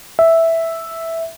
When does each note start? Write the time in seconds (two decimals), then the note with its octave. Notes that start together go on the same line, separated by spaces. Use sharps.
0.19 E5